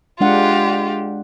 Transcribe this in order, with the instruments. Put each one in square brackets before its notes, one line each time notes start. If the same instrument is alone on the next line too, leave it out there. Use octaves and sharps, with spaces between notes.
[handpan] G#3 D4 F#5 [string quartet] F4 G4